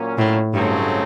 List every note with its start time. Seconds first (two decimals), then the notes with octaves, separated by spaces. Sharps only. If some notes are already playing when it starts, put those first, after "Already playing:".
Already playing: A#2 F#3 A#3 C#4
0.18 A2
0.54 G2 C#3 F#3 A3 C4 D#4